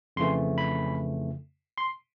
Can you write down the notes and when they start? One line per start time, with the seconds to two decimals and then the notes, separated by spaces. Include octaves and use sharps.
0.16 F2 C#3 E3 A3 C6
0.58 B5
1.78 C6